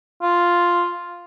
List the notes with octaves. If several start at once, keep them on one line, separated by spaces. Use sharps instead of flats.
F4